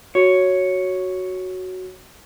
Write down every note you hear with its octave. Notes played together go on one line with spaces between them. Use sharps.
F#4 C#5